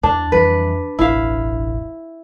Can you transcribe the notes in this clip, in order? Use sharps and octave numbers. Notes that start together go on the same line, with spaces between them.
E2 D4
F2 E3 G3 B4
E1 A1 E4 F5